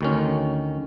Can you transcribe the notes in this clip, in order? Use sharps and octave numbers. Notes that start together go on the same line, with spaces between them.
D2 D#3 C#4